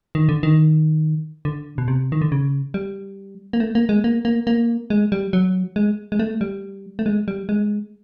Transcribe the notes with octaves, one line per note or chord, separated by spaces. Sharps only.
D#3
D3
D#3
D3
B2
C3
D#3
D3
C#3
G3
A#3
A3
A#3
G#3
A#3
A#3
A#3
G#3
G3
F#3
G#3
G#3
A3
G3
A3
G#3
G3
G#3